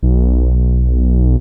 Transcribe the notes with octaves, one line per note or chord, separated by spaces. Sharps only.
B1